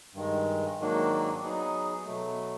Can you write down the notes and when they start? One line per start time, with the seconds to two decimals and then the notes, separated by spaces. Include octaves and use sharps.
0.14 G2 D#3 G#3
0.79 G#2 D#3 F#3 A#3 D4
1.42 F#3 B3 D#4 G#4
2.06 B2 F#3 A3